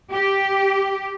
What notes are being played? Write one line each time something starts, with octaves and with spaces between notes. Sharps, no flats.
G4